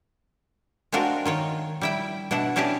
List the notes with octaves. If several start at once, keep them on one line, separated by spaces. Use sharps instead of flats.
G#3 C4 D4 F4 F#4 A#4
D#3 F4 C#5
G3 E4 G5
B2 D4 E4 F#5
C#4 D4 E4 G4 G#4 A5